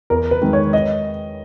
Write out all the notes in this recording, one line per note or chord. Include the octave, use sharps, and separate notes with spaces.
E2 A#4
B4
D#3 G#3
C#5
D#5